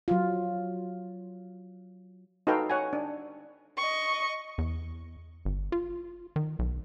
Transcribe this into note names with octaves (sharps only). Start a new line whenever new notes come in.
F#3 F4
D#4 F#4 A4 B4 F5 G5
C#5 F#5 G#5
D4
D#5 C#6
E2
G1
F4
D#3
B1